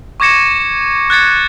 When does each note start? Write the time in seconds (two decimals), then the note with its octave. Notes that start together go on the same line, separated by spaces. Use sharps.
0.20 C#6 D6 G#6 A#6 C#7 E7
1.10 F#6 G#6 A6 C#7